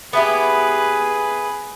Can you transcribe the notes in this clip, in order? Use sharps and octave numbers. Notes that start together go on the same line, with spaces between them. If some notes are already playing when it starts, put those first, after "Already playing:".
B3 E4 G4 G#4 B4